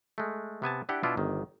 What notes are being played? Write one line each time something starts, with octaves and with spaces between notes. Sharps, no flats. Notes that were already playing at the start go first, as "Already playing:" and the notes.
G#3 A3
C3 B3 G#5 A5
D4 E4 G4 F#5 G5
B2 D4 E4 F4
G1 D#3